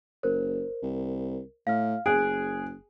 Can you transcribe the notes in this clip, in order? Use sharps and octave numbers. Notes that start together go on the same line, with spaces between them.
F#1 A#4 C5
C2
A2 F5 F6
F#1 G#4 F#6 D7